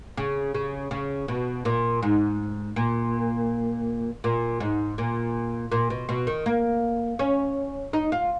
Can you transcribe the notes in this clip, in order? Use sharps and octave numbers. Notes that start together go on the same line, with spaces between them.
C#3
C#3
C#3
B2
A#2
G#2
A#2
A#2
G#2
A#2
A#2
B2
B2
D#3
A#3
C#4
D#4
F4